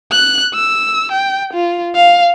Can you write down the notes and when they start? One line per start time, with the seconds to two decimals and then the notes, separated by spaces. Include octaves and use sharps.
0.12 F#6
0.54 E6
1.12 G5
1.53 F4
1.95 F5